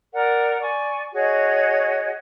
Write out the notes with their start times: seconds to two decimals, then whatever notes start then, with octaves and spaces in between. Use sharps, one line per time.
0.12 A#4 D5 F#5
0.60 D5 G#5 C#6
1.14 F#4 G#4 C#5 D#5